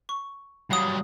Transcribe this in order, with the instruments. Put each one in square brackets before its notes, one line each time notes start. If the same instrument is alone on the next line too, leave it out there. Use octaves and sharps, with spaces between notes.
[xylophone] C#6
[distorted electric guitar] G2 F#3 [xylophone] F5 F#5 D#6